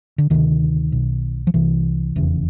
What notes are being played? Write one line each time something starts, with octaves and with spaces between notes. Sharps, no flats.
D3
D2 C3 D#3
B1 B2
F3
C2 C3 E3
F1 E2 C#3